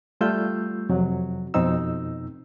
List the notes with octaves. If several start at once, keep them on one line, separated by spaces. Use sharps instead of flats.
G3 A3 F4 E6 G6
F2 C3 F#3
F2 B2 C4 D#4 E6